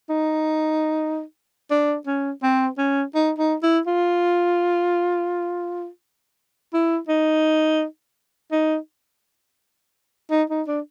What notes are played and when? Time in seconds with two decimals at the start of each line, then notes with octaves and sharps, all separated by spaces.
0.09 D#4
1.71 D4
2.06 C#4
2.43 C4
2.78 C#4
3.15 D#4
3.38 D#4
3.63 E4
3.87 F4
6.73 E4
7.08 D#4
8.52 D#4
10.31 D#4
10.50 D#4
10.67 D4